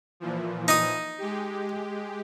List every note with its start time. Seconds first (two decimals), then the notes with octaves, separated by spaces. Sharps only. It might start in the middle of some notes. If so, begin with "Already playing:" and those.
0.20 A#2 E3 F3
0.68 D#4 D#6
1.18 G#3 G4